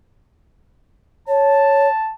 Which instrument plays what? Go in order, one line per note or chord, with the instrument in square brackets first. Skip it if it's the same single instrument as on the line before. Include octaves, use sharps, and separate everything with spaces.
[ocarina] C#5 [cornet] A5